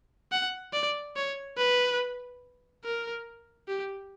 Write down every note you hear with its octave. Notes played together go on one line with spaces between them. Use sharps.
F#5
D5
C#5
B4
A#4
G4